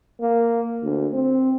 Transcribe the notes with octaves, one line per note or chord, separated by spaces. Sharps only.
A#3
D2
C4